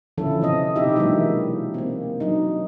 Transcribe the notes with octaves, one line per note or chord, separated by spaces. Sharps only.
D3 E3 F3 C#4 E4 A4
C3 C4 D#5
B2 D#4 E4 G4 E5
E3 F#3 G#3 A#3 D4 D#4
A#3 C4
F#3 D4 D#4